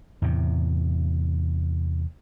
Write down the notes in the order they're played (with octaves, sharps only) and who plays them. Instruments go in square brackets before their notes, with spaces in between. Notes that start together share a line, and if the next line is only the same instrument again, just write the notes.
[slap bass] E2 A2 C3